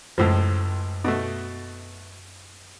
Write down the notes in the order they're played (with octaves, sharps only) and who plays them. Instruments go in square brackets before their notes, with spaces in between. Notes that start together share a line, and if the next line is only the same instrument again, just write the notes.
[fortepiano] C#2 A2 F3 [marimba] F#2
[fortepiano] B2 A3